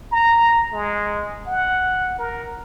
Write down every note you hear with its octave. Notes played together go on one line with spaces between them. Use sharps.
A#5
G#3
F#5
A#4